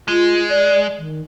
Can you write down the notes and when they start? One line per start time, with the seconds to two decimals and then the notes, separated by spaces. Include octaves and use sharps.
0.08 G#3 F4
0.49 D5
0.99 D#3